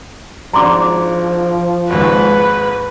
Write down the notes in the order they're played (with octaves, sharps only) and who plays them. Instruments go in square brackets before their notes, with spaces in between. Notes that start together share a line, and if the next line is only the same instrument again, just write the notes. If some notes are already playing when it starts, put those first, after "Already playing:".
[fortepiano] G#1 D4 [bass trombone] F3 [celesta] A#5 C6 D6
[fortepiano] G#1 D#2 G#2 [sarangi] B4